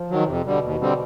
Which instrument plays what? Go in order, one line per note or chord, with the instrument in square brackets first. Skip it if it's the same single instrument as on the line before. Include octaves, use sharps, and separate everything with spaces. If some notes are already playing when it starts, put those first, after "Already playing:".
Already playing: [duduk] F3
[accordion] D#3 F#3
[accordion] F2 [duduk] C3
[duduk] B2 [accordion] D3 G3
[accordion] D#2
D3 G3 C4